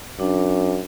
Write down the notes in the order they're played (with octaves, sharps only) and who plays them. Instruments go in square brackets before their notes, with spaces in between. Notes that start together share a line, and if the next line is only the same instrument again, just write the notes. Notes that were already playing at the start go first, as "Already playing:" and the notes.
[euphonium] F#2 [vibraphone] D4